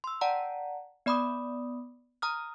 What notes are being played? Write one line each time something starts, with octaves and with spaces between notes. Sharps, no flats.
C6 E6
D5 F#5 G5 A5 A#5
B3 D5 B5 D6 D#6
A#5 D#6 F6